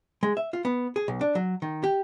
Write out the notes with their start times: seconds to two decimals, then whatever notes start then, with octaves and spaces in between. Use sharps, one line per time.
0.23 G#3
0.37 E5
0.53 F4
0.65 B3
0.96 G#4
1.08 B1
1.21 D4
1.35 F#3
1.62 D#3
1.84 G4